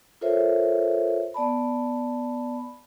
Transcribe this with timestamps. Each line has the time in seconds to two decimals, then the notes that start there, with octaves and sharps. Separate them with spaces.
0.21 F4 A4 A#4 C5 C#5 E5
1.34 B3 D5 A5 B5